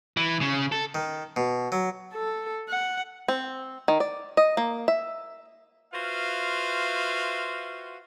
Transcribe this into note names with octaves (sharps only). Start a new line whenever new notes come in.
E3
C#3
A4
D#3
B2
F#3
A4
F#5
C4
D#3
D5
D#5
A#3
E5
F4 F#4 B4 C5 E5 F5